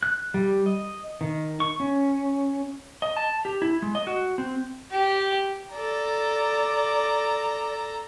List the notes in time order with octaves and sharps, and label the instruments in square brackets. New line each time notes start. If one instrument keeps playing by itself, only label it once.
[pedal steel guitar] F#6
G3
D#5
D#3
C#6
C#4
[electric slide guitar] D#5
A5
G4
E4
G#3
D#5
F#4
C4
[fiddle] G4
[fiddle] A4 A#5 [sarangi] D5